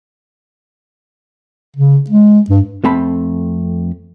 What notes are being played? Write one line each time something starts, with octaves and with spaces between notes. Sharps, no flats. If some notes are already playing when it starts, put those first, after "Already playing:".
C#3
G#3
G2
F2 A3 C4 A5 B5